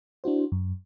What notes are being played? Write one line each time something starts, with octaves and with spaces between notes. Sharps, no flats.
D4 E4 F#4 C5
F#2